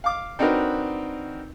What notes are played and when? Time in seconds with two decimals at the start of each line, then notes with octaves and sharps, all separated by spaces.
0.04 F5 D6
0.39 C4 D4 D#4 F#4 A#4 B4